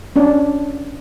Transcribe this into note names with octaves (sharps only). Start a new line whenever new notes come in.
C#4 D4